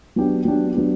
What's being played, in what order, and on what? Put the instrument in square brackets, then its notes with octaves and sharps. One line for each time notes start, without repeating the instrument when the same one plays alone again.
[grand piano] F#3 B3 D4 G4
F#3 B3 D4 G4
F#3 B3 D4 G4